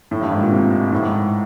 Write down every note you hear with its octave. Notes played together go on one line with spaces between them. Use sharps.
A2
G2
G#2
A#2
C3
A2
G#2